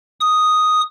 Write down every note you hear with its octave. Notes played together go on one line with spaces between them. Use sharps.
D#6